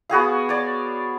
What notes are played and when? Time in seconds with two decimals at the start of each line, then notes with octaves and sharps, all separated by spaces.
0.10 B3 F#4 G#4 F5
0.49 C#5 D5